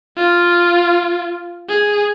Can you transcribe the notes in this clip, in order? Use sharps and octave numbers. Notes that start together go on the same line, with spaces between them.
F4
G#4